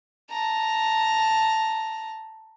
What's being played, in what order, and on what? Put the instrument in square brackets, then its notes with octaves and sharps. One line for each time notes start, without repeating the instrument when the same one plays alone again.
[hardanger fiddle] A5 A#5